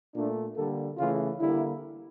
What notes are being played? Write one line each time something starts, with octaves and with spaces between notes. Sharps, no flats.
A#2 A3 D4
D3 G3 A#3 A4
C#3 E3 A3 F4
D3 G3 A#3 E4